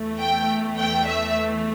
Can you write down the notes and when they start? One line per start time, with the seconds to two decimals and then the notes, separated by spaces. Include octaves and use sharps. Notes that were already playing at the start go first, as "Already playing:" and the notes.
Already playing: E2 E3 A3
0.19 G5
0.78 G5
1.08 E5